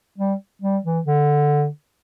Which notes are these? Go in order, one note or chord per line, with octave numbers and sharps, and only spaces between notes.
G3
G3
E3
D3